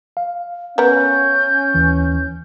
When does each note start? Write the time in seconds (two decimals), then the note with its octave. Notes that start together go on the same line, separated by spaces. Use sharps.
0.17 F5
0.78 B3 C#4 A#4 G6
1.74 D#2 E3